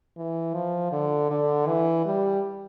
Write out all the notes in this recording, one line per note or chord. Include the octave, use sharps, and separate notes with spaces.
E3
F3
D3
D3
E3
G3